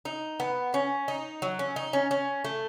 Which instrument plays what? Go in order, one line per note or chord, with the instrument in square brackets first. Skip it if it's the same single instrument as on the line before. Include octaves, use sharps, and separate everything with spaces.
[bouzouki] D#4
B3
C#4
D#4
F#3
C#4
D#4
C#4
C#4
A3